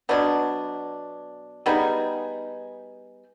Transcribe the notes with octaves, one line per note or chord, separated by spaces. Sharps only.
B2 F#3 B3 D4
G3 B3 D#4 G#4